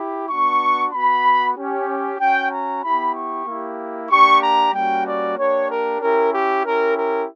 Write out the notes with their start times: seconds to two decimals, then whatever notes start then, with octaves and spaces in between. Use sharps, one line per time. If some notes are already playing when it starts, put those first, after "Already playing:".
Already playing: E4 G4
0.28 B3 D4 F#4 C#6
0.92 B3 F#4 B5
1.56 C#4 G4
2.19 C#4 F#4 G5
2.51 A#5
2.82 B3 E4 G4 B5
3.15 C#6
3.46 A#3 E4 G4
4.10 A#3 D4 G4 C#6
4.42 A#5
4.73 G3 A#3 C#4 F#4 G5
5.05 D5
5.37 A#3 D4 G4 C#5
5.69 A#4
6.01 C#4 E4 G4 A#4
6.33 G4
6.64 C#4 E4 G4 A#4
6.96 A#4